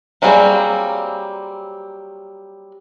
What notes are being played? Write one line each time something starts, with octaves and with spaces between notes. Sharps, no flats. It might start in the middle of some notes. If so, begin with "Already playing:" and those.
F#3 G3 A#3 C4 G#4